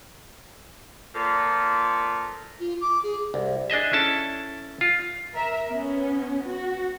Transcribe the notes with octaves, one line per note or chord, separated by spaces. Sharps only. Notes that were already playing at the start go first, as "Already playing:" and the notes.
A#2 F3 A4
F4
D6
G#4
C2
D4 G#4 D#5 E5
C#4 E4 A4 A5
F4
A#4 E5
B3 C#4
F#4